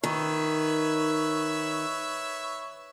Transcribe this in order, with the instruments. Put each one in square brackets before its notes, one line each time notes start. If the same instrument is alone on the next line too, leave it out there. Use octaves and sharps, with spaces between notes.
[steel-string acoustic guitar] D#3 [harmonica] B4 C#5 E5